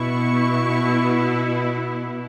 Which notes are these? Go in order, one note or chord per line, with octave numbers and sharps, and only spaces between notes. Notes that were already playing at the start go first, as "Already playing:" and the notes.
Already playing: B2 B3 E4 C#6